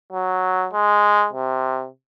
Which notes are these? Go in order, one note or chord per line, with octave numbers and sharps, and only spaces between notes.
F#3
G#3
C3